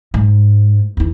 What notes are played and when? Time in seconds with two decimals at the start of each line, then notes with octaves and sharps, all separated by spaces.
0.14 G#2
0.97 E2 D#4